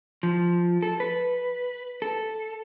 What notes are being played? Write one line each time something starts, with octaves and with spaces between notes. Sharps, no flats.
F3
A4
B4
A4